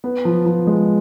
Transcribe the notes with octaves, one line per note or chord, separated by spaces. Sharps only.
B3
F3
F3
G#3